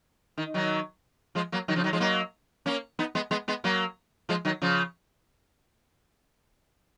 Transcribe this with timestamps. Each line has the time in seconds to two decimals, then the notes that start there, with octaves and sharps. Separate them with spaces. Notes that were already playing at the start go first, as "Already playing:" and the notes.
0.37 D#3
0.54 D#3 F#3
1.35 F3 G#3
1.52 F#3 A#3
1.68 D#3 F#3
1.76 C#3 F3
1.84 D#3 F#3
1.93 F3 G#3
2.00 F#3 A#3
2.66 A#3 C#4
2.99 B3 D#4
3.15 G#3 B3
3.31 G#3 B3
3.48 G#3 B3
3.64 F#3 A#3
4.29 F3 G#3
4.45 D#3 F#3
4.62 C#3 F3